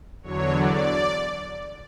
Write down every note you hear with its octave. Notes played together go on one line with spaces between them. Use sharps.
E2 D3 F#3 C#5
D5